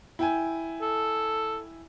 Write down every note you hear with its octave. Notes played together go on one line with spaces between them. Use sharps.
E4 G5 G#5
A4